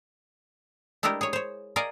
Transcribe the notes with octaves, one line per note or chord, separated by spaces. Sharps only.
G#3 A3 D4 E4 G4 A#4
G#4 C#5
C5 C#5
A#4 D5 D#5 F5 G#5 A#5